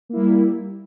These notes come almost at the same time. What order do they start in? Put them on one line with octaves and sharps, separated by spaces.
A#3 E4 G3